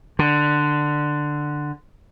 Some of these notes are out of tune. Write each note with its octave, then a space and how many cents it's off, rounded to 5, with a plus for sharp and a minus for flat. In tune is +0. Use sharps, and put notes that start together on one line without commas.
D3 +10